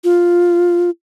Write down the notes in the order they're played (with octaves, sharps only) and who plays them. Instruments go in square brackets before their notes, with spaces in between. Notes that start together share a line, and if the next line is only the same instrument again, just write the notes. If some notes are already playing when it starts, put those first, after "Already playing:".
[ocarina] F4